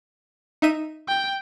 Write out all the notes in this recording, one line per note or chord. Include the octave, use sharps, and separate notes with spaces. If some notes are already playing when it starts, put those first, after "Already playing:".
D#4 E5 D#7
G5